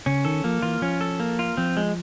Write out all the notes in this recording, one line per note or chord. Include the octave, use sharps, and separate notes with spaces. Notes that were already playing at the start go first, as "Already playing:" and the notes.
C#3 C#4
D#3 A4
F3 A#3
E3 F4
F3 C#4
A4
A#3
F4
F3 C4
G#3